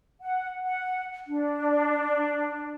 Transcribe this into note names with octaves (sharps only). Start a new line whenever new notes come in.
F#5
F#5
D4